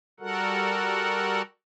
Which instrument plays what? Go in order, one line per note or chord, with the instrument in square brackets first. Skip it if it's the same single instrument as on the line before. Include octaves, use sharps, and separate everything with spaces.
[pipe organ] G3 F#4 A4 A#4 F#5